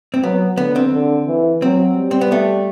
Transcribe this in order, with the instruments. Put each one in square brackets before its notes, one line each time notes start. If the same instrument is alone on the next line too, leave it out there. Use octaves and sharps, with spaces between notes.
[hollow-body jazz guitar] C4
[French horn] F#3 [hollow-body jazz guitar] B3
[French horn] D3 [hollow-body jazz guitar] B3
[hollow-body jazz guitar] C4
[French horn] D3
E3
[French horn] F#3 [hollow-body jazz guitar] C4
[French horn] G3
[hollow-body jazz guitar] C4
B3
A3